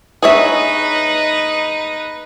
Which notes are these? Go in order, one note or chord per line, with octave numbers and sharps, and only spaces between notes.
D#4 G#4 B4 C#5 E5